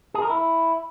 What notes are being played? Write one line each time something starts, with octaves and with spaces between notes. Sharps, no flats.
G#4
A#4
E4